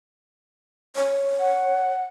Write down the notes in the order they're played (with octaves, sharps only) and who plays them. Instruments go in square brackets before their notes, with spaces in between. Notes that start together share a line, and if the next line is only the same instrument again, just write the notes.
[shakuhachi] C#5
[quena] F#5